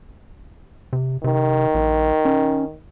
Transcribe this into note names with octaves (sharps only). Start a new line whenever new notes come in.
C3
C3 D#3
A#1
C#4